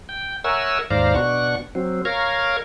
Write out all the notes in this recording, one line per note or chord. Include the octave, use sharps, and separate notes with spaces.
G5
A#4 C#5 E5 F#5 G#5 E6
D#2 G#2 C5 D5 F5 A#5
B2 D4 F#5 C#6
F#3 C4
A#4 C#5 F5 A#5 G#6